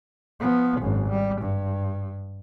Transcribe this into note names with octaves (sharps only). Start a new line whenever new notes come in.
F3 B3
G#1 F#2
G3
G2